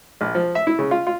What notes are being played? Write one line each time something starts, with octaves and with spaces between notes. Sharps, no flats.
A#1
F3
E5
E4
C#3
F4
F4